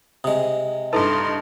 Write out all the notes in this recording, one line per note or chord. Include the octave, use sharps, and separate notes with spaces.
C3 G#3 D#6
G2 D#4 E4 A4 B4 A5 C6